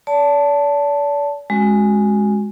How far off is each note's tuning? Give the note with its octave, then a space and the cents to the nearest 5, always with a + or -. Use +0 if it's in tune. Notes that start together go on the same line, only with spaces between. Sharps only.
D5 -40 A5 +0
G#3 +0 C#4 -30 F#4 +0